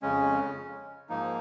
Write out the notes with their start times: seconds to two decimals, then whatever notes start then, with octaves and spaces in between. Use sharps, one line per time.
0.02 F2 C#3 G#3 C#4
1.09 G#2 F3 A#3 D#4